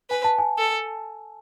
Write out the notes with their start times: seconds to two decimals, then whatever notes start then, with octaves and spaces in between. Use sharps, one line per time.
0.10 B4 G#5
0.24 A5
0.39 G#5
0.59 A4